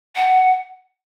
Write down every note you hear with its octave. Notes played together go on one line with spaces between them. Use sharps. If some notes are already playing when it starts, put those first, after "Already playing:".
F#5